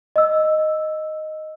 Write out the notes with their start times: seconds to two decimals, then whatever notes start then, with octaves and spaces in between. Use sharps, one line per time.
0.16 D#5 E6